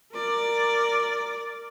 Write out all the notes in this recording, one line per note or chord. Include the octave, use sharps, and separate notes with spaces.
A#4 D5